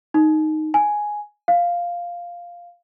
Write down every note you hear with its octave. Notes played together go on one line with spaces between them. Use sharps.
D#4
G#5
F5